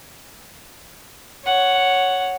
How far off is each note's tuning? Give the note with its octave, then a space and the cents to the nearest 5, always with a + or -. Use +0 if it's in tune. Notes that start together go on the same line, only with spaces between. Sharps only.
C#5 +0 F#5 +0